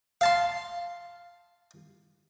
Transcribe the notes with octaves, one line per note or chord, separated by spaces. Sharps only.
F5 A5 C6